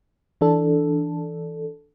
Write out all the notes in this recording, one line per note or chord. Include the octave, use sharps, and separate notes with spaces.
E3 D4 A4